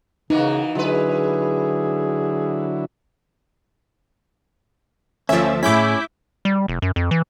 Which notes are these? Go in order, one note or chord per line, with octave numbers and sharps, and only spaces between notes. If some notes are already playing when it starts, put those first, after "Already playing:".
C#3 E3 A#3 D#4 F#4
D3 F#3 G#3 E4 G#4 B4
D2 F3 C#4 D5 E5
A2 C#4 E4 G#4 D6 G6 B6
G3
F1
F#2
F2
E3